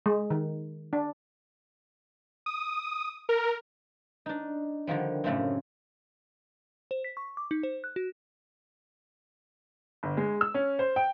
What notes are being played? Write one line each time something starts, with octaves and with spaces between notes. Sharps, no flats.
G#3
D#3
D4
D#6
A#4
D4 D#4
D3 D#3 F3 G3
F#2 A2 C#3 A3 C4
C5
B6
C#6
D6
D#4
C5
F#6
F#4
G1
G#3
E6
C#4
C5
G5